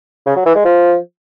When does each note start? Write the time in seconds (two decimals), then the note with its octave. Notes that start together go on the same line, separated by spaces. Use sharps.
0.26 C#3
0.36 F#3
0.46 E3
0.55 G#3
0.65 F3